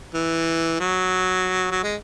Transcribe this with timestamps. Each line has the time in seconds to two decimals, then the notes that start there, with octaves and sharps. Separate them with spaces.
0.14 E3
0.80 F#3
1.71 F#3
1.83 G#3